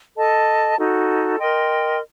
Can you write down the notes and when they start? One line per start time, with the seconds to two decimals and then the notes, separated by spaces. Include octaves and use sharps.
0.17 A4 D#5 A5
0.78 D#4 F#4 A4
1.39 A#4 D#5 G5 C6